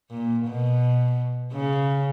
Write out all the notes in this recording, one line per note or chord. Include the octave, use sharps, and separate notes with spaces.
A#2
B2
C#3